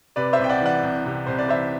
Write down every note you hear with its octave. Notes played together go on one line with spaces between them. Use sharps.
C3 B4 D5
C5 E5
C2
G5
D5 F#5
E3
D5 F#5
C2
C3
C2 C5
D5
E3 C5 E5